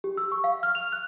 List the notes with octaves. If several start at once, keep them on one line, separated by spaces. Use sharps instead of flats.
G4
E6
C#6
F5
F6
F7
F#6